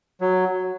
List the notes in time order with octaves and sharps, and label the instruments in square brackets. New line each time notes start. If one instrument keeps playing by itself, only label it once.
[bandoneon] F#3